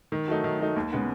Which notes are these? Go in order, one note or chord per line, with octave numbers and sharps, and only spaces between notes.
D#3
F#3 A3 D#4
D#3
F#3 A3 D#4
D#2
C#3 G#3 B3